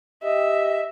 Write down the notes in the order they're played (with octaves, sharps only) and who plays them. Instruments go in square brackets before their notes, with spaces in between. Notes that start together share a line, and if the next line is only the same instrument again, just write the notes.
[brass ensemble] G4 [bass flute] D#5 [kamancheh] E5